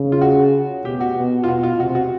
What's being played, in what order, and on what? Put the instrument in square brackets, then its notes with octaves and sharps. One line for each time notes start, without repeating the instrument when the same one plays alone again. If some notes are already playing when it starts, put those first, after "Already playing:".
Already playing: [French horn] C#3
[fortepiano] F4
F#4
[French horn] B2 [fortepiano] G4
[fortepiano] F#4
[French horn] B2
[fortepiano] F4
[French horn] B2 [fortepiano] F#4
[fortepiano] F4
[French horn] C3 [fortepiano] F#4
[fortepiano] F#4